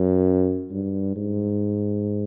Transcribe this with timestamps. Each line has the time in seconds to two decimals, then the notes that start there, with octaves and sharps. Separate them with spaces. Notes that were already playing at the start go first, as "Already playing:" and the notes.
Already playing: F#2
0.71 G2
1.16 G#2